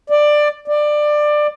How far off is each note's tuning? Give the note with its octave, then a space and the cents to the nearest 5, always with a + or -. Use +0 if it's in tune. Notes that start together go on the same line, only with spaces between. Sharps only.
D5 +15
D5 +20